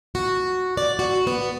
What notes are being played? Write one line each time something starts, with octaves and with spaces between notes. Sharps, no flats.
F#4
D5
F#4
B3